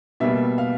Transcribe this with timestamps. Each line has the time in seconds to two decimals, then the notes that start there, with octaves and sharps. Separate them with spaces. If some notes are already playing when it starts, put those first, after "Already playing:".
0.20 B2 G3 A#3 E5
0.58 F5